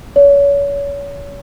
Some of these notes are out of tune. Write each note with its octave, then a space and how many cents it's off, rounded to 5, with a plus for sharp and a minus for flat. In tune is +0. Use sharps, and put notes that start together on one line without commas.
C#5 +35